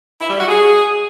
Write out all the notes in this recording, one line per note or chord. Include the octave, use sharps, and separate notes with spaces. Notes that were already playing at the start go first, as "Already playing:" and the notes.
E4
G3
F#4
G#4